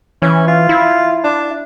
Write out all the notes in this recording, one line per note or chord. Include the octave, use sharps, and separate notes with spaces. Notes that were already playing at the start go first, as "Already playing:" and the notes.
E3 C#4
F4
E4
D4